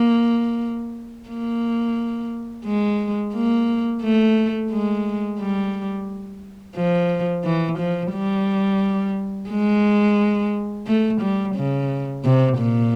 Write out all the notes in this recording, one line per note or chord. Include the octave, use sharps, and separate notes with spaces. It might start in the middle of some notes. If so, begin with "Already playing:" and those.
Already playing: A#3
A#3
G#3
A#3
A3
G#3
G3
F3
E3
F3
G3
G#3
A3
G3
C#3
C3
A#2